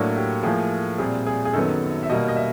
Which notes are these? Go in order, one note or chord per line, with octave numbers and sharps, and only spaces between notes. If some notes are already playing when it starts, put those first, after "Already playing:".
Already playing: A2 F#3 A#3 D4 F#4
G4
A2 F3 A#3 G#4
A#2 G3 C4 G#4
G#4
G#4
F#2 D#3 F#3 B3 A4
E5
B2 G3 A#3 D#5
D#5
E5